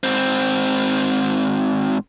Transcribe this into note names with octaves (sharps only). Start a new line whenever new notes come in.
G#2 C4